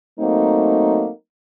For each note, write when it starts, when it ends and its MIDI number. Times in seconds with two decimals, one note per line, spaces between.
0.20 1.10 54
0.20 1.10 57
0.20 1.10 58
0.20 1.10 60
0.20 1.10 63